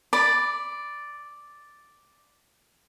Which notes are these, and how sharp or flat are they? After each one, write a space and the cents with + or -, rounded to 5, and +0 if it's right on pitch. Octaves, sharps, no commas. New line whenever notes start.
D5 +0 B5 +0 D6 +25